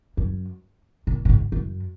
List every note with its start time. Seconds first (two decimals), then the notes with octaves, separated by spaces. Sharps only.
0.17 F#2
1.07 A#2
1.25 A#2
1.29 G#2
1.52 F#2